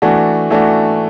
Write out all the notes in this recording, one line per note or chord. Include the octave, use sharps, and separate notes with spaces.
E3 A3 D4 F#4
E3 A3 D4 F#4